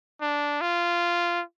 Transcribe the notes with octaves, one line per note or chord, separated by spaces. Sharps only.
D4
F4